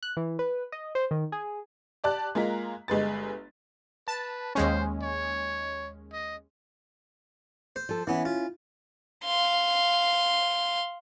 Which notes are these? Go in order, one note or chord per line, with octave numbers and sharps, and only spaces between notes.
F#6
E3
B4
D#5
C5
D#3
G#4
G4 D5 A5 F#6
G#3 A#3 F4 A#5 B6
G1 G#3 B4 A6
B4 A5
D#2 G#3 C#4 C5
C#5
D#5
C5
F3 A4
E3 B3 C#4 E4
F4
F5 C6